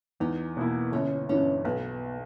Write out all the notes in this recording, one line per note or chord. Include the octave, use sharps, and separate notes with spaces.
E2 D#4
B2 A#3 E4
G1 C#4
G2 E3 C#4
B1 B3